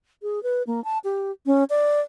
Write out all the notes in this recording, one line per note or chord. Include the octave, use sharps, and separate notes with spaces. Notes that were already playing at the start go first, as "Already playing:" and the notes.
G#4
B4
A#3
A5
G4
C#4
D5